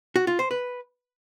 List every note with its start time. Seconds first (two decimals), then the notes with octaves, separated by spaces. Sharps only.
0.16 F#4
0.27 F4
0.39 C5
0.51 B4